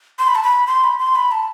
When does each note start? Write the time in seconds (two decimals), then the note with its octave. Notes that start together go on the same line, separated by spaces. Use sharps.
0.19 C6
0.27 B5
0.35 A5
0.43 B5
0.67 C6
0.84 B5
0.98 C6
1.15 B5
1.31 A5